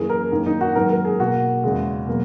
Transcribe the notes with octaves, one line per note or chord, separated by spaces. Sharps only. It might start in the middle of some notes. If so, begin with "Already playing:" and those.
Already playing: F#2 E3 A#3 G#4
A#4
F#2 D#3 A#3
D#4
F#4
G#2 D#3 F#3 A#3 A#4
A#4
G#4
B2 A#3 F#4
E2 C#3 G#3
B2 F#3 A#3